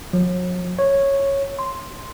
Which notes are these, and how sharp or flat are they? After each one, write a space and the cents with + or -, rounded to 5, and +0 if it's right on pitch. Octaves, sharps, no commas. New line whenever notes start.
F#3 -40
C#5 -10
C6 +0